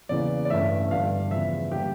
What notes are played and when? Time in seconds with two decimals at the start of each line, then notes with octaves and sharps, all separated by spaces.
0.09 E2 C#3 E3 A#3 D5
0.45 D5
0.50 A1 G2 E3 A3 C#4 E5
0.91 G1 G2 E3 G3 D4 F5
1.31 E2 C#3 F3 E5
1.72 D3 G3 A#3 G4